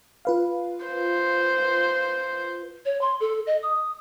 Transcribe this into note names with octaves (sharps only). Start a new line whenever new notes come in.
F4 B4 F5
C5
C#5
C6
A4
D#5
D#6